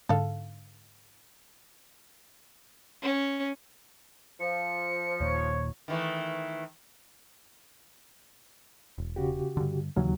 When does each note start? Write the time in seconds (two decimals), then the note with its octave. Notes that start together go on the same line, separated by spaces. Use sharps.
0.09 G#2 D3 A4 F5
3.02 C#4
4.40 F3 C#7
5.21 D#1 D#2 A#2 C#5
5.88 D#3 E3 A3
8.98 E1
9.16 C#3 F#4 G4
9.57 G2 D3
9.96 D#2 C#3 E3 F#3